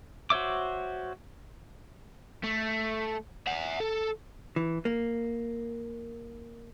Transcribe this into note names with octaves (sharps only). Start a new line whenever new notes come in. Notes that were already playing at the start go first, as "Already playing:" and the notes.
F#4 C5 C#5 E5 D6
A3
E5 F#5
A4
E3
A#3